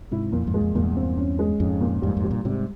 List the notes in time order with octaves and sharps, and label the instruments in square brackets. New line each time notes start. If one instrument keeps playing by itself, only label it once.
[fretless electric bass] G#2 C3 [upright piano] E4
[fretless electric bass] F2 [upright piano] A#2
[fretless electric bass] F2 G#2
[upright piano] G#3
[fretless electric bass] F2
[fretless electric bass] E2 G2 [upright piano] A#2
[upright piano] C4
C#4
G#3
[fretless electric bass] F2 G#2 [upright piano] C#4
[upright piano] A#2
[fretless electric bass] F2 G#2 [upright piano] G3
[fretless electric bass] F2 G#2
[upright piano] G3
[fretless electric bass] G2 A#2
[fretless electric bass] G#2 C3 [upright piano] G3